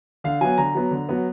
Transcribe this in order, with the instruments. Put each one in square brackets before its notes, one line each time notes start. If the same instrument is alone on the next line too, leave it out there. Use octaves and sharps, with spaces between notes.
[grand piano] D3 F5
F#3 B3 G#5
D3 A#5
F#3 B3
D3
F#3 B3